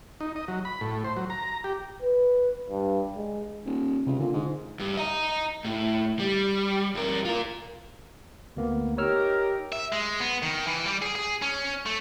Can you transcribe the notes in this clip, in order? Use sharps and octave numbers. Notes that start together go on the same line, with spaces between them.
D#4
D#5
F#3
B5
A2
C5
F#3
A#5
G4
B4
G2
G#3
D#1
C#2 C3
A#2 D3
G#2
G2
D#5 A#5
A2
G3
G2 A#4
F4 A#4
D2 A#3 B3
D#4 G4 A#4 C#5 E6 F6
E5
G#3
B3
D#3
E3
G3
G#4
G#4
C#4
A3